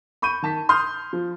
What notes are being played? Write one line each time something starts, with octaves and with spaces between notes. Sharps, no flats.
B5 C#6 G6 D#7
D#3 A5 B6
C6 D#6 F6 G6
F3